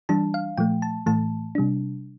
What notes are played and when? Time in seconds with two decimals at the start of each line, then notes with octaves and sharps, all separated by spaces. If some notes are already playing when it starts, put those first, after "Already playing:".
0.09 E3 G3 D4 A5
0.34 F5
0.57 A#2 F3 A3 G5
0.82 A5
1.06 A2 E3 A3 A5
1.55 C3 G3 D4